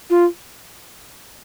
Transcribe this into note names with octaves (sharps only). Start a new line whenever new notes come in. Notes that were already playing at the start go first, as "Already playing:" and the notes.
F4